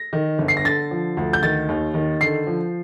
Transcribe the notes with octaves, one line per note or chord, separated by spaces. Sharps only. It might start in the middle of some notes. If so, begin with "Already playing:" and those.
Already playing: A#6
D#3
G1
C7
A#6
D3 A6
F3
D2
G6
D#3 A6
D#2
D#3
D3 C7
F3